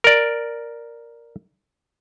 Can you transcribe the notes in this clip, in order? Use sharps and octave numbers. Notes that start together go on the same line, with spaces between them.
A#4 D5